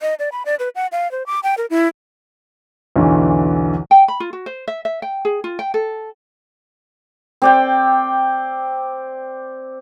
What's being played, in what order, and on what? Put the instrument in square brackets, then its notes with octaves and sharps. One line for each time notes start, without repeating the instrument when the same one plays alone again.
[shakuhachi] D#5
D5
B5
D5
B4
F#5
F5
C5
D6
G5
A#4
E4
[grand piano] B1 E2 D3 E3
[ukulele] G5
B5
F4
F#4
C5
E5
E5
G5
G#4
F4
G5
A4
[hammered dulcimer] C4 D5 G5